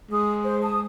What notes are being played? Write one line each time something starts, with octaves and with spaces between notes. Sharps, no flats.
G#3 D#6
C5
A5 D#6